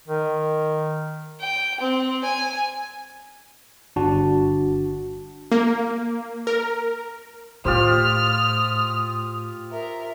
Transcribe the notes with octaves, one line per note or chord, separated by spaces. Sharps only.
D#3
G5
C4
G#5
G1 D4 F#4 A5
A#3
A#4
A2 F4 G4 C5 D#6 F6
A#4 E5